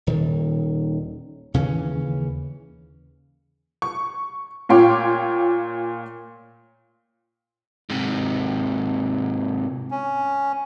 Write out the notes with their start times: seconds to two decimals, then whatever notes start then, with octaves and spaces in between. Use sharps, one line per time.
0.07 D#1 D#3
1.54 D#2 C#3 E3 C#4
3.82 C#6
4.69 A#2 F4 C#5 G5 C6 D6
7.90 G#2 C3
9.91 C#4